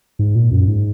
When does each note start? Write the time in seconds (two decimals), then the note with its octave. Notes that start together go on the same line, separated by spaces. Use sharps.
0.19 G#2
0.35 A#2
0.52 F#2
0.68 G#2